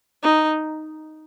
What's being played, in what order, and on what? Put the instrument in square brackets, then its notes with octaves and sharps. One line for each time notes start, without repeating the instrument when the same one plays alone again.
[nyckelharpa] D#4